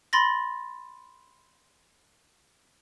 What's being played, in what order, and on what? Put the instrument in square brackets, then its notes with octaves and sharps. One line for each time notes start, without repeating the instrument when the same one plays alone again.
[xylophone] B5 C6 A6 A#6